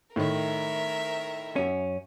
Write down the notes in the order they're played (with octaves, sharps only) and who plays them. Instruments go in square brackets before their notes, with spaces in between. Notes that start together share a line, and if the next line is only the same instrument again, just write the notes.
[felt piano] A2 D#3 [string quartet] A#4 E5
[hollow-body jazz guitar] F#2 C#4